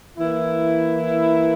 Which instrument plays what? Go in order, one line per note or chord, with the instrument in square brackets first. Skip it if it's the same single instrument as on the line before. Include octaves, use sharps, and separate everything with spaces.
[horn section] E3 A#3 E4